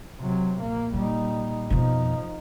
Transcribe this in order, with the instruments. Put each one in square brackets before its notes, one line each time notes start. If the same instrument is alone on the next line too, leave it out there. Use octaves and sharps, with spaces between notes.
[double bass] C3 F#3
A#1 A#3
[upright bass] A#2 [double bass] G3 D#4
[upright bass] F2 B2 [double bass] F3 D#4